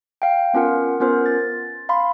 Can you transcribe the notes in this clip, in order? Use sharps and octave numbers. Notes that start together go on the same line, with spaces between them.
F5 G5
B3 C#4 F4 A#4 F#5
B3 C#4 F4 A#4 C5
A6
F5 B5 C6